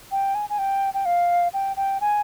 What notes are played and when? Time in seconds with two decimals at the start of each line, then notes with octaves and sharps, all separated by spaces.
0.12 G5
0.35 G#5
0.50 G#5
0.58 G5
0.94 G5
1.05 F5
1.53 G5
1.77 G5
2.01 G#5